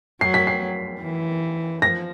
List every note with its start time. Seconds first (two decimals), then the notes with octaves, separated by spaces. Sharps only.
0.21 F#3 C7
0.34 B6
0.47 C7
1.01 E3
1.82 F3 A#6